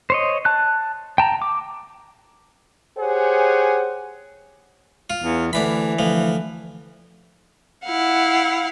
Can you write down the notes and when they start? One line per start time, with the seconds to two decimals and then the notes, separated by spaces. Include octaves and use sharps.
0.10 C5 C#5 D#5
0.45 A5 F#6
1.18 G5 A5 A#5
1.42 D6
2.99 G4 G#4 C5 C#5 F#5 G#5
5.10 F4
5.23 E2
5.53 D2 E3 D4 B5
5.99 D2 F3
7.84 E4 F5 F#5